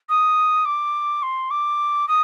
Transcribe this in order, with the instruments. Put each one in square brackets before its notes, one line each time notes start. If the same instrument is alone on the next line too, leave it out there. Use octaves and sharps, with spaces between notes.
[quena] D#6
D6
C6
D6
D#6